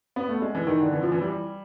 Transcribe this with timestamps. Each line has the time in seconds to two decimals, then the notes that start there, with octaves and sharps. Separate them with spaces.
0.16 B3
0.29 A3
0.42 G#3
0.55 E3
0.67 D#3
0.81 D3
0.92 E3
1.02 F3
1.12 E3
1.21 G3